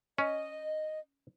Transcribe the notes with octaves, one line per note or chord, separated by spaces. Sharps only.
C#4 D#5